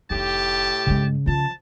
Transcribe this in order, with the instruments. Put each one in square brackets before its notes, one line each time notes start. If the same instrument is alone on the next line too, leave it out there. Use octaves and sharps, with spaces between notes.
[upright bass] F1 D#4 [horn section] A2 G4 [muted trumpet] A5
[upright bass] G2 G#3 [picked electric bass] C#3
[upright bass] F3 F4 [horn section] A5